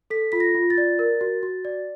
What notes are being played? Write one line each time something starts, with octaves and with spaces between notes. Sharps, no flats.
A4 B6
F4 B6
A#6
F4
A6
D5
A#4
F#4
F#4
D5